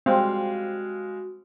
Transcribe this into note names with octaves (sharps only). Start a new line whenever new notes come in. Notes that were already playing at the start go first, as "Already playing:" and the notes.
G3 G#3 C4 F#4 F5